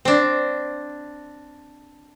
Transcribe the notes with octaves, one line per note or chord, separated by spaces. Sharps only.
C4 D4